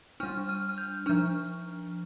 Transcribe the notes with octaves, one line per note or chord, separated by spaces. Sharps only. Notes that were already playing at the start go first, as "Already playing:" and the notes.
G3 D4 F6
F6
F6
G6
F3 D4 F6